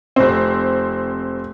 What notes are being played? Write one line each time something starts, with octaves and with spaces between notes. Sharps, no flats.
F1 C4